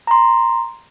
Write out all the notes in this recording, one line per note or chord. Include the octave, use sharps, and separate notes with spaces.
A#5 C6